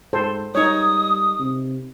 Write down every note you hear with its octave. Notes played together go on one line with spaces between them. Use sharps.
G#2 A4 C5
G3 D#4 C#5 D#6
C3